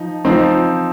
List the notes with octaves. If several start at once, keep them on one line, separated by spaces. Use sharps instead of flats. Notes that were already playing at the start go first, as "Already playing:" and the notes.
Already playing: F3 D#4
F3 C4 D#4